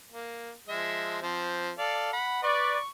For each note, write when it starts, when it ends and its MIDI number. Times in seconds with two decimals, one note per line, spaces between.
0.12 0.51 58
0.68 1.20 53
0.68 1.20 56
0.68 1.20 76
1.22 1.70 53
1.22 1.70 60
1.78 2.12 69
1.78 2.12 74
1.78 2.12 77
2.13 2.42 78
2.13 2.42 83
2.43 2.79 71
2.43 2.79 74
2.43 2.88 85